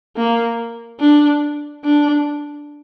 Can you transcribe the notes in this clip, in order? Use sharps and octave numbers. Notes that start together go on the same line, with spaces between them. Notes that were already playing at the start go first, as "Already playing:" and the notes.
A#3
D4
D4